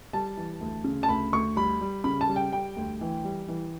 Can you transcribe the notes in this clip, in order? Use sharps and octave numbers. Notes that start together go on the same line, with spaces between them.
G3 A5
E3
D2
C#3
A5
D2 B5
D2 C#6
G3 B5
G3
C#3 B5
A5
G3
G5
G3 G5
D2
E3
G3
E3